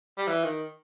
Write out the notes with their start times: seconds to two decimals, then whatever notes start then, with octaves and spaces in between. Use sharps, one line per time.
0.18 G3
0.28 E3
0.44 D#3